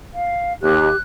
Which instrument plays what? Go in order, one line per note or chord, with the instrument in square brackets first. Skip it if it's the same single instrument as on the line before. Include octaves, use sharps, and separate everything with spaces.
[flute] F5
[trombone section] D#2 [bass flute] G4 [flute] F#6